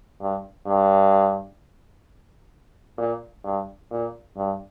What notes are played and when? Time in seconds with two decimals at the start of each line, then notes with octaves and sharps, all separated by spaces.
0.20 G2
0.66 G2
2.98 A#2
3.44 G2
3.91 A#2
4.36 G2